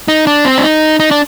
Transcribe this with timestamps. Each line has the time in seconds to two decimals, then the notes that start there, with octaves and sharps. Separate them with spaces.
0.08 D#4
0.27 D4
0.45 C4
0.58 D4
0.63 D#4
1.00 D#4
1.11 D4